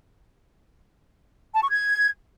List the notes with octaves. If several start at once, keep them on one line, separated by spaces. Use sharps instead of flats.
A5
C#6
G#6